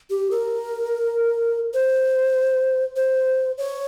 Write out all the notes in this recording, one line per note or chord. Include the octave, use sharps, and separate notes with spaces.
G4
A#4
C5
C5
C#5